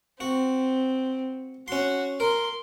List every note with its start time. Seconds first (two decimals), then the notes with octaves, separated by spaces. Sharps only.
0.20 C4 F#4
1.68 C#4 F#4 C6
2.20 A#4 C6